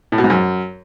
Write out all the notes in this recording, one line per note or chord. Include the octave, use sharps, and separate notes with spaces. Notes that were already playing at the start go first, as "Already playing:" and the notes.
A2
B2
G#2
F#2